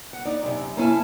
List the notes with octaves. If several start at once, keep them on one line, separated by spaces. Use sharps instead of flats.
F#5
D#4 D5
F#2 C3
A#3 C#4 E4 G#5 A5